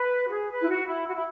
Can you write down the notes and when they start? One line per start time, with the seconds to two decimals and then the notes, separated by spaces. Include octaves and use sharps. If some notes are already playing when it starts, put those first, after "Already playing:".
Already playing: B4
0.27 F#4
0.31 G#4
0.51 B4
0.62 E4
0.69 F#4
0.88 E4
1.07 F#4
1.15 E4